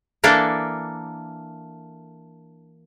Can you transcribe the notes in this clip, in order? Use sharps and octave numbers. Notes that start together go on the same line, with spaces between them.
E3 A#3 D4 A4